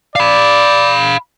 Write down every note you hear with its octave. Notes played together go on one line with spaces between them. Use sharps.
D5 F5 B5